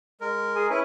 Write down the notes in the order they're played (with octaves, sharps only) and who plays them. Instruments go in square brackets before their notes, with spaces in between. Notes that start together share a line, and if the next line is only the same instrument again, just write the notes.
[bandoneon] G#3 A#4
[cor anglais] G#4
[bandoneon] C#4 E4 [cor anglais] B4